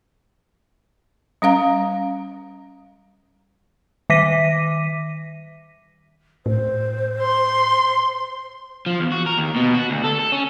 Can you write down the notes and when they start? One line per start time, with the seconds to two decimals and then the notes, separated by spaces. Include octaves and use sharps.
1.42 G3 C#4 F5 A#5
4.10 D#3 E5 D6 A#6 B6 D#7
6.46 A2 C5
7.21 C6
8.86 F3
9.00 E2
9.12 F#4
9.27 A#4
9.38 D#2
9.56 B2
9.74 F#4
9.90 D2
10.04 A4
10.19 A4
10.32 C#4